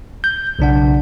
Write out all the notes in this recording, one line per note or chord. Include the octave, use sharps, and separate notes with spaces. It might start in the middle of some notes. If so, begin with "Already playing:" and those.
G6
B1 C#3 D4 F#5